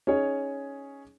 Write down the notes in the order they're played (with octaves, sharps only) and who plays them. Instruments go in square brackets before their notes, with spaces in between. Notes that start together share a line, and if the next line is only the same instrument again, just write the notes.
[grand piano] C#4 D#4 G#4 C#5